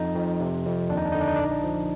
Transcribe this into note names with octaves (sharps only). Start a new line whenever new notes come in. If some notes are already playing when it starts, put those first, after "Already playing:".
Already playing: F2 D#4
F2
C3
F2
D#2 D4
D#4
D4
D3 D#4
D4
D#4
A#1 D4
D#4
D4
F3